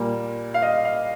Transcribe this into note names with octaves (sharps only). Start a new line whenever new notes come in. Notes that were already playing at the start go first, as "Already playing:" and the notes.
Already playing: A#2 G3 A#3
F5
D#5
F5